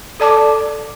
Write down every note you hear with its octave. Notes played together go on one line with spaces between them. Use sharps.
A4 D5 A5 D6